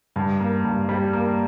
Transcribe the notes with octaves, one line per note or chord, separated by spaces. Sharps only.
G2
A#3
G2
G3
A#3